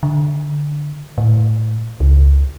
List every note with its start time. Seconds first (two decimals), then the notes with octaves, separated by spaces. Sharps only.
0.03 D3
1.18 A2
2.00 C#2